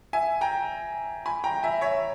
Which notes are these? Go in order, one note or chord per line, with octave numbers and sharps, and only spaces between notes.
E5 G#5
G5 A#5
G#5 B5
G5 A#5
E5 G#5
C#5 E5